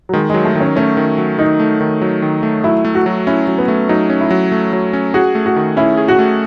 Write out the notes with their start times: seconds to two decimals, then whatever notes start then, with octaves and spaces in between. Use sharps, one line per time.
0.09 F#3
0.13 D#3 G#3
0.30 F#3 G#3
0.44 A3
0.55 D#3
0.60 C#4
0.76 A3 C#4
0.97 D#3
1.18 F#3
1.38 D#3 D#4
1.60 A3
1.81 D#3
2.01 F#3
2.22 D#3
2.43 A3
2.64 F#3 E4
2.85 A3
2.95 F#4
3.06 F#3
3.27 C#4 E4
3.48 F#3
3.58 B3
3.68 A3
3.89 F#3 D#4
4.10 C#4
4.21 E4
4.31 F#3
4.52 A3
4.73 F#3
4.93 C#4
5.14 F#4 G#4
5.35 A3
5.46 F#4
5.56 D#3
5.77 C#4 E4
5.97 G#4
6.08 F#4
6.19 A3